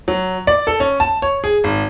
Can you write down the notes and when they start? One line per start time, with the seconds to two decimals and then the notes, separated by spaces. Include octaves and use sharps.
0.08 F#3
0.47 D5
0.67 A4
0.80 C#4
1.00 A5
1.22 C#5
1.44 G#4
1.64 G#1